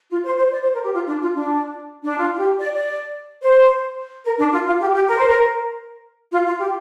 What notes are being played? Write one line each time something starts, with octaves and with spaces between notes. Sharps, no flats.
F4
C5
C5
D5
C5
A#4
G4
F4
D4
F4
D4
D4
F4
F4
G4
D5
D5
C5
A#4
D4
F4
F4
G4
G4
A#4
C5
A#4
F4
F4
G4